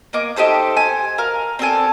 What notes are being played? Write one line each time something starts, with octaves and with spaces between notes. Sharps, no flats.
A#3 D#5 G#5 D6
D#4 G4 A4 C5
C5 G#5
A#4 F5
C4 D4 A4 G#5